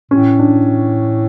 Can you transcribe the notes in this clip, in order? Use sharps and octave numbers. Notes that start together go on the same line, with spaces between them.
A2 C#4
D4